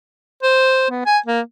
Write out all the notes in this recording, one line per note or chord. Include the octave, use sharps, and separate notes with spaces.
C5
B3
G#5
A#3